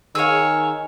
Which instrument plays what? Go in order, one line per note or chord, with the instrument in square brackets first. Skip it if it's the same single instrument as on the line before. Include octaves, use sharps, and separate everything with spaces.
[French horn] D#3 [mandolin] G#4 F5 [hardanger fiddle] C#5 [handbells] E6